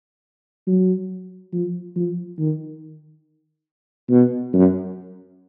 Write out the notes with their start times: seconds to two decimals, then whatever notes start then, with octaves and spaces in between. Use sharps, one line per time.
0.67 F#3
1.52 F3
1.96 F3
2.39 D#3
4.10 B2
4.54 F#2